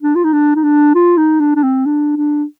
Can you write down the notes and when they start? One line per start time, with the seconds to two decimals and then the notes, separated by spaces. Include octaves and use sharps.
0.02 D4
0.15 F4
0.24 D#4
0.33 D4
0.56 D#4
0.64 D4
0.95 F4
1.17 D#4
1.40 D4
1.56 D4
1.63 C4
1.86 D4
2.17 D4